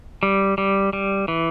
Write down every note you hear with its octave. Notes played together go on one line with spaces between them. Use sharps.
G3
G3
G3
E3